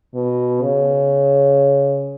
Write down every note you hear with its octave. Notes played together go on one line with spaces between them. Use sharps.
B2
C#3